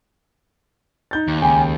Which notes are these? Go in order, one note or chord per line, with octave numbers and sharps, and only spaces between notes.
D#4 G6 A6
D#2
C#2 G5 G#5 B5